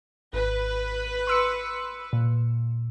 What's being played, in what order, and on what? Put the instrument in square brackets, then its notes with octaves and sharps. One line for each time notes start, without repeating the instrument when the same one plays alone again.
[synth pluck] G#1 [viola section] B4
[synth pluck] C6 E6 C#7
A#2